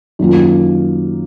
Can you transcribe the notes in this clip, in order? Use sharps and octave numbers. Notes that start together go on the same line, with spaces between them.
F#2 D#3 A#3 F4